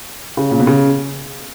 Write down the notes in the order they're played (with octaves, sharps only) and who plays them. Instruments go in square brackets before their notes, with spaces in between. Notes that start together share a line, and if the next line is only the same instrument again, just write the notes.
[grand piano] C#3
A#2
B2
C#3